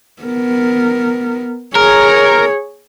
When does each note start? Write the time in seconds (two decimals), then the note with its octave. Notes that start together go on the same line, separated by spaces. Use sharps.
0.22 B3 A#4
1.75 G#4 A#4 C#5